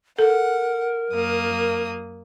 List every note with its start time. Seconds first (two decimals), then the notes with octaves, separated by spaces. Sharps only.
0.19 A4 A#4 F#5
1.13 F#2 A#3 D#6